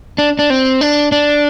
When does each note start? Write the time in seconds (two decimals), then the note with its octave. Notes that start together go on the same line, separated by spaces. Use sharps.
0.18 D4
0.39 D4
0.50 C4
0.81 D4
1.12 D4